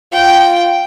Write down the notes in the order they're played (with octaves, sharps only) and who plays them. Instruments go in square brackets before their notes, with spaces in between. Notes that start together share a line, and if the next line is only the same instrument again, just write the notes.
[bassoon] F4 [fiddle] G5